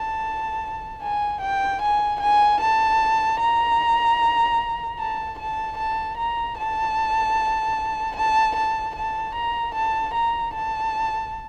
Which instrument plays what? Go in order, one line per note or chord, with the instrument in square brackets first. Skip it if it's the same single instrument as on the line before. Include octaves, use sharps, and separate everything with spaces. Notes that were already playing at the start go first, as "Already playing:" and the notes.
Already playing: [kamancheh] A5
G#5
G5
G#5
G#5
A5
A#5
A5
A5
A5
A#5
A5
A5
A5
A5
A#5
A5
A#5
A5